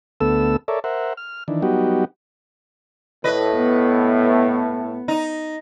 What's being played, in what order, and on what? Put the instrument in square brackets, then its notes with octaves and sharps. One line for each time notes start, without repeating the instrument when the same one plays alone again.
[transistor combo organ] D2 A3 B3 A4 E6
A4 A#4 C#5 D5 E5
A#4 C5 E5 F#5
F6
D#3 E3 D4
F#3 G3 B3 D#4 F#4 G4
[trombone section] A2 [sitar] B4 D#5
[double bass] B3
[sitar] D#4